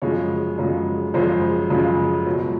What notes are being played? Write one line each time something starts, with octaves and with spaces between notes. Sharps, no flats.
F#2 C#3 F3 G#3 C#5
F#2 C#3 F3 G#3
F#2 C#3 F3 G#3 C5
F#2 C#3 F3 G#3
C#2 B2 F#3